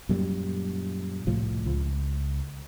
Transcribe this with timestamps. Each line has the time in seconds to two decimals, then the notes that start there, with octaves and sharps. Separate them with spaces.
0.09 F#2 A#2 G3
1.27 C2 A2 F3
1.66 C#2